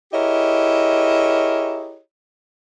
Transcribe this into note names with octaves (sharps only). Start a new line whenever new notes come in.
E4 G4 G#4 A#4 C#5 D#5